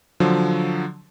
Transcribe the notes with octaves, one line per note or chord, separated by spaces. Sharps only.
D3 F3 F#3